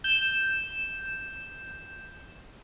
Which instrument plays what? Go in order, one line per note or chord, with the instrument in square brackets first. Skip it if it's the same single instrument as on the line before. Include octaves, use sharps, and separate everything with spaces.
[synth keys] G6 E7